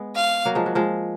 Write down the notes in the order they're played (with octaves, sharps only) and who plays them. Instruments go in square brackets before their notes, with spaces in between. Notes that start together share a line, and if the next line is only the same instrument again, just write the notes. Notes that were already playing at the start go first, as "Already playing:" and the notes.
Already playing: [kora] G#3 B3
[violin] F5
[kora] F#3 A#3
F3 G#3
F#3
F3 G#3